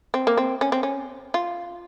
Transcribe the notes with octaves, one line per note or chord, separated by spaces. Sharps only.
C4
A#3
C4
C#4
C4
C#4
F4